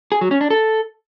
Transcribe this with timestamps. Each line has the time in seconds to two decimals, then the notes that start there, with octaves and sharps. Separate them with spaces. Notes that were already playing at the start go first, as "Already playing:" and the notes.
0.12 G#4
0.21 F#3
0.31 C#4
0.41 D4
0.50 A4